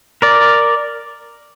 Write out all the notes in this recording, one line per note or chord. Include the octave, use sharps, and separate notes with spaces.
A#4 D5